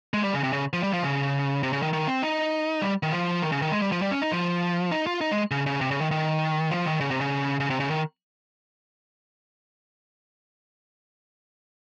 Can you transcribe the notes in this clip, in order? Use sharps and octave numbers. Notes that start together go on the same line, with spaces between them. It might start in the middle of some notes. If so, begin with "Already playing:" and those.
G#3
G3
C#3
C3
C#3
F3
G3
F3
C#3
C3
C#3
D#3
D#3
C4
D#4
G3
D#3
F3
D#3
C#3
D#3
G#3
G3
F3
G3
C#4
D#4
F3
D#4
F4
D#4
G#3
C#3
C#3
C3
C#3
D#3
D#3
F3
D#3
C#3
C3
C#3
C#3
C3
C#3
D#3